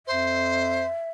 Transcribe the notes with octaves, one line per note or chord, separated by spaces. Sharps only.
F2 C5 E5